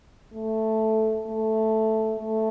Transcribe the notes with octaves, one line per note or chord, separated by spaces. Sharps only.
A3
A3
A3